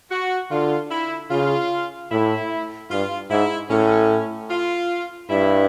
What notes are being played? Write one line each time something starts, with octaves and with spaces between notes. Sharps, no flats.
F#4
D3 F4
E4
C#3 F4
A2 E4
G2 F4
G#2 E4
A2 C#4
F4
G2 E4